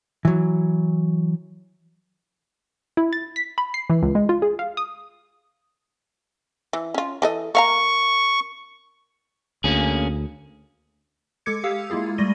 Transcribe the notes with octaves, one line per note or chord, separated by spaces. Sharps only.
E3 F#3
E4
A6
B6
B5
C7
E3
C#2
G#3
F4
G#4
F5
D#6
E3
C#4 F4
E3 A4 D#5
A#3 F5 A#5 C#6
D2 A#3 C#4 G#4
G#3 A4 D6 G#6 C#7
G4 F5 D#6 E6
G#3 A#3 E4 F4 G#4
G3 A3 D5 A#6 D#7 G7